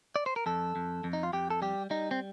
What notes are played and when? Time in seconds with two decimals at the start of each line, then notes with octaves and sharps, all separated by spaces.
0.16 D5
0.26 C5
0.36 A#4
0.46 F2 A4
0.76 F2
1.04 F2
1.13 D#4
1.23 F4
1.33 F2 G4
1.50 A4
1.62 G3 G4
1.90 G3 D#4
2.11 C4